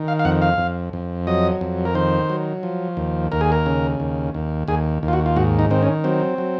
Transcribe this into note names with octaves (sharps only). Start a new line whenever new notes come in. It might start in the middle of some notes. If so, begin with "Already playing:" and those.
Already playing: D#3
F5
F5
F2 F#5
F5
F2
F2
F#3 D#5
F2
A#4
D#3 C5
F#3
F3
D#2
D#2 A#4
G#4
A#4
C#3
D#2
D#2
D#2 G#4
D#2
F4
F#4
F4
G#2 F#4
D#4
D#3 C4
C#4
F#3 C4
F#3